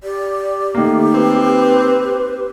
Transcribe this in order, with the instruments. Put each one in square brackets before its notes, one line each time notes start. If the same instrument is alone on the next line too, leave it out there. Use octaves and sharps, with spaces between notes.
[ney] G4 [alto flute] D5
[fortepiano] D#3 A#3 [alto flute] A3
[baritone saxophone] C4 [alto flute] B4